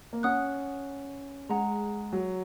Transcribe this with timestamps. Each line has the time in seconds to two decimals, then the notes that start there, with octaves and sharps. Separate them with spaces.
0.13 A#3
0.23 C#4 F#5 D#6 F#6
1.49 G#3 G#4 F#5 A#5
2.13 F#3